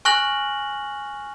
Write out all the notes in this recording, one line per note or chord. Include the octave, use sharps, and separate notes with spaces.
G#5 C#6 F6 F#6 A#6 F#7